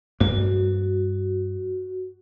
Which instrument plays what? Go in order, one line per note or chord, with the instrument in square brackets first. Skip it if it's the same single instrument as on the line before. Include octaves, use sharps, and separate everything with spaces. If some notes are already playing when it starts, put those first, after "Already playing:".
[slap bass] G2 A#3 [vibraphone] F#4